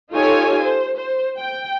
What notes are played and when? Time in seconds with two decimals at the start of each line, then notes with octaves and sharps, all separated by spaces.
0.12 D#4 F4 G4 A4 C#5 G#5
0.63 C5
0.97 C5
1.39 G5